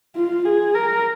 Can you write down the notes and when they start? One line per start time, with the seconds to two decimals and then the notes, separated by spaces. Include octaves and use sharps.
0.16 F4
0.45 G#4
0.75 A#4